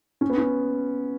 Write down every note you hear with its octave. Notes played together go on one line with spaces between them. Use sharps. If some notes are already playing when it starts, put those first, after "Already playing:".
C#4
B3
C#4